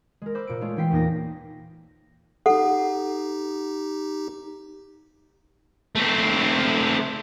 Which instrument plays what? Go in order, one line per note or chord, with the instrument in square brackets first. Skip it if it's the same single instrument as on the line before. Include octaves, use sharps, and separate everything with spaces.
[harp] G#3 A#4
C5 B5 D6 E6
A#2 C#7 D7
G#3 A3 F4 C#5
E3 C#4 G5 B6 C7
E2 A#2 A#3 D#4 D6 A#6
[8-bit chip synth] D#4 G4 [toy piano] A4 F#5
[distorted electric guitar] A3 C4